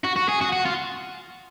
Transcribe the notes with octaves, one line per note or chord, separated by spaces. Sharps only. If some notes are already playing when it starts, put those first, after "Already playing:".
F#4
F#4
G#4
F#4
F#4
F4